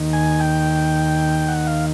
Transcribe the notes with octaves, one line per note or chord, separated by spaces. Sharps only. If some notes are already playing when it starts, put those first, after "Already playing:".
Already playing: D#2 D#3
G#5
G5
F#5
F5